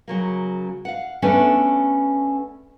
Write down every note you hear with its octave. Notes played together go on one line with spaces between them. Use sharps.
C#3 F#3 A#3
F5 F#5
A3 B3 C#4 D4 A4 B4